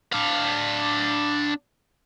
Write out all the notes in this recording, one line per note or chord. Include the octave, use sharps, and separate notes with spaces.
D4 F5